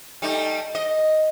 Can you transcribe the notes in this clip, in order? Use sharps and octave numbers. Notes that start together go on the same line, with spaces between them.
G3 A3 D#4
D#5